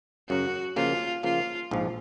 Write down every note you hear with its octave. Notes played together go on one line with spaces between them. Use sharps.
F#2 C#3 F#3 F#4
C#3 F3 A#3 F4
C#3 F3 A#3 F4
A#1 G#2 F3